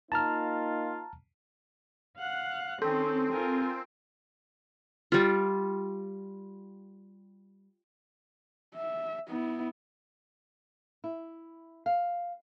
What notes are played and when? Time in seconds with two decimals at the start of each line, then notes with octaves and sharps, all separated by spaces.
0.12 A#3 D#4 F4 A5 A#5 F6
2.18 F5 F#5 F#6
2.82 D#3 C4 C#4 A4
3.31 F4 A#4 G#5
5.12 G3 F4
8.75 E5
9.28 B3 E4
11.04 E4
11.86 F5